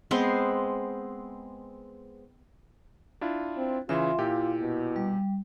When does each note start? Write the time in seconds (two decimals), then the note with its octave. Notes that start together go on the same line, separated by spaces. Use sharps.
0.11 G#3 B3 C4 C5
3.21 D4 E4 F4
3.57 C4
3.89 C#3 E3 F4 E5 C6
4.18 A#2 E4 G4
4.61 B2
4.96 G3